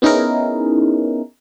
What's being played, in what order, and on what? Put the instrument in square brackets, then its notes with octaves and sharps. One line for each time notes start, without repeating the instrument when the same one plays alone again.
[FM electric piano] B3 C#4 D#4 E4 G#4 A#4